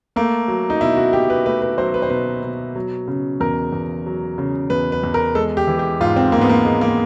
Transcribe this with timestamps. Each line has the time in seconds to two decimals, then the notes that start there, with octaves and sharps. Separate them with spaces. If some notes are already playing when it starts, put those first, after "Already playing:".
0.16 A3 A#3
0.48 F#3
0.70 D#4
0.81 B2 E4
0.97 F#4
1.13 B2 G4
1.30 B4
1.46 A3 B4
1.62 B4
1.78 F#3 C5
1.94 B4
2.02 C5
2.10 B2 B4
2.43 B2
2.75 F#3
3.08 C#3
3.40 E2 A#4
3.73 E2
4.06 F#3
4.38 C#3
4.70 E2 B4
4.92 B4
5.03 E2
5.14 A#4
5.35 G#3 A4
5.57 G4
5.67 E3
5.79 G4
6.01 G#2 F4
6.16 C4
6.32 G#2 A#3
6.41 B3
6.49 A#3
6.65 G#3
6.81 A#3